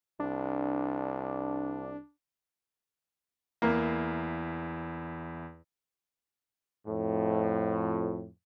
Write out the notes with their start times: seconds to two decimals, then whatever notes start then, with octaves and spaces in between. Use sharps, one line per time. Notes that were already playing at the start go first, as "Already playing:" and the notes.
0.20 C2 D4
3.62 E2 A#3 E4
6.86 F2 A2